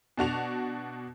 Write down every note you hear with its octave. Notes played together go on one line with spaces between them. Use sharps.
B2 D4 F#4 F7